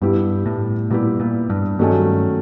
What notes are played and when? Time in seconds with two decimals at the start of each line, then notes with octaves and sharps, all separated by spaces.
0.02 G2 G3 B3 E4 G4
0.46 A2
0.90 A#2 G3 B3 E4 G4
1.20 A#2
1.50 G2
1.79 G2 D#3 F#3 A3 C#4